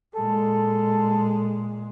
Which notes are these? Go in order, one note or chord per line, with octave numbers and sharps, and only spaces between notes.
A#2 G#3 A4